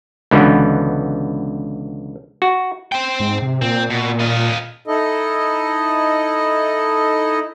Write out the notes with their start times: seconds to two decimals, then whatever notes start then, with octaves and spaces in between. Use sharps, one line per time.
0.31 C#2 B2 D3 E3 B3
2.42 F#4
2.92 C5 G5
3.20 G#2
3.42 C3
3.62 A#2 C4
3.90 B2
4.19 F4 D#5
4.87 D#4 E4 A4 D#5